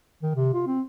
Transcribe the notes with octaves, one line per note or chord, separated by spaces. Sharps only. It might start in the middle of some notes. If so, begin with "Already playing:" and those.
D#3
C3
F4
C4